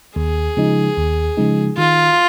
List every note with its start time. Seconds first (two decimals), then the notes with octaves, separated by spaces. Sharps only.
0.16 D#2 G#4
0.57 C#3 F3 G#3 D#4
0.97 D#2
1.37 C#3 F3 G#3 D#4
1.77 D#3 F4